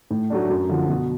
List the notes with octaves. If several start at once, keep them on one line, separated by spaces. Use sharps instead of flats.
A2
F#3 A3 D4
F#2
D3 F3
B2